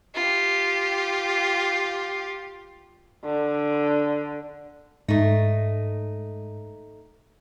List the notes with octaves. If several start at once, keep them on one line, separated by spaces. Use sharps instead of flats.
F4 G4
D3
G#2 A3 D#4